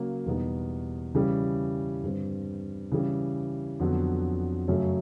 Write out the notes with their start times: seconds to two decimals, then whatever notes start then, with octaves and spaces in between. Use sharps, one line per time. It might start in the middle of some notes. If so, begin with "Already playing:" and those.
Already playing: C#3 F#3 A#3
0.25 E2 B2 G3 B3 D#4
1.15 C#3 E3 G3
2.03 G2 D3 G3 C4
2.91 C#3 E3 G3
3.80 F2 D3 F#3 B3
4.68 F#2 C#3 F#3 A3 C#4